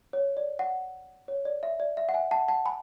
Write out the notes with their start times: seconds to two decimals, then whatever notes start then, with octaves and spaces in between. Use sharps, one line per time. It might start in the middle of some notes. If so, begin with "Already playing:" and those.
0.13 C#5
0.37 D5
0.59 F#5
1.28 C#5
1.45 D5
1.63 E5
1.80 D5
1.97 E5
2.09 F#5
2.14 E5 G#5
2.31 F#5 A5
2.48 F#5 A5
2.65 G#5 B5